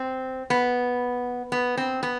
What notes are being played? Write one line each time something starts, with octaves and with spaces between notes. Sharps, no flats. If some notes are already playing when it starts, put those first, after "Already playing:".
Already playing: C4
B3
B3
C4
B3